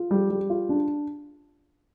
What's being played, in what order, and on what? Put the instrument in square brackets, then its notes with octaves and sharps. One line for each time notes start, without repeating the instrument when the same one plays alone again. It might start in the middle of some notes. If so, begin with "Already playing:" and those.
Already playing: [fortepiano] F4
G3
G3
F4
D4